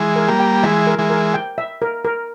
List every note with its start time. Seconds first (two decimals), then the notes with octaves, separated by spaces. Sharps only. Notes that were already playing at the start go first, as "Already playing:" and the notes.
Already playing: E3 G#3
0.16 A#4
0.28 G3 A#3
0.40 G5
0.63 E3 G#3 E5
0.87 A#4
0.99 E3 G#3
1.10 A#4
1.34 G5
1.58 E5
1.82 A#4
2.05 A#4